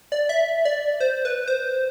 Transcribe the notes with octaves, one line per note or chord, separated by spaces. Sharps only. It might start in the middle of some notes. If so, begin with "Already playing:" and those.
D5
E5
D5
C5
B4
C5